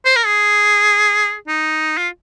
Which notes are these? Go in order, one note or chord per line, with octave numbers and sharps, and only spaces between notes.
C5
A#4
G#4
D#4
F4